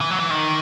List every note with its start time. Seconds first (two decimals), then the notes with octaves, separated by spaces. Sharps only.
0.01 E3
0.10 F#3
0.20 E3
0.30 D#3